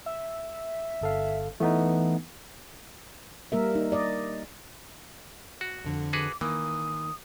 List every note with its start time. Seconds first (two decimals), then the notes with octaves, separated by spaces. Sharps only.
0.06 E5
1.01 G1 A4 F5
1.60 E3 A3 B3 D#4
3.52 G3 A#3 A#4 E5
3.75 D#4
3.92 D5 D#5
5.61 F#4
5.85 F2 D3
6.13 F#4 G#4 B4 D6
6.41 D#3 E3 A#3 D#6